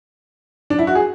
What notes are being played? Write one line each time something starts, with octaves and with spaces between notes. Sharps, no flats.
D4
E4
F#4
G#4